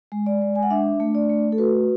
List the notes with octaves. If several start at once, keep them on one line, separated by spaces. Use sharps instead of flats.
G#3
D5
G#3
G#5
F#5
D4 E5
A3
D5
A3
A4
F#4 B4